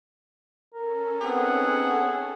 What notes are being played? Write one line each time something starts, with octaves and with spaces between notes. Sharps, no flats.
C#4 A4 A#4
B3 C4 D#4 G#4 F#5